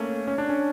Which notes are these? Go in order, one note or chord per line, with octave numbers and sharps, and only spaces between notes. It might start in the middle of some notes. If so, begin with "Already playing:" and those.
Already playing: A3 A#3 C#4
C#4
D4
C#4